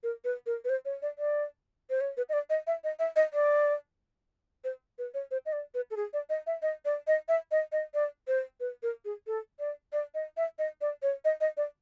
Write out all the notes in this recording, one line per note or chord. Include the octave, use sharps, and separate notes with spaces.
A#4
B4
A#4
B4
C5
C#5
D5
D5
C5
C#5
B4
D#5
D5
D#5
E5
D#5
E5
D#5
D5
C5
B4
C#5
C5
D#5
D5
B4
A4
G#4
D5
D#5
E5
D#5
D5
D#5
E5
D#5
D#5
D5
C5
B4
A#4
G#4
A4
D5
D5
D#5
E5
D#5
D5
C#5
D#5
D#5
D5